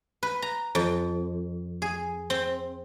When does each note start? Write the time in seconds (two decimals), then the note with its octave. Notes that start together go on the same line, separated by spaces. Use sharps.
0.23 B4
0.42 A#5
0.75 F2
1.82 G#4
2.30 C4